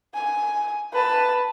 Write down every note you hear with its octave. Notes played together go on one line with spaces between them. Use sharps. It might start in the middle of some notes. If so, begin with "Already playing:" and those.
G#5
B4 A5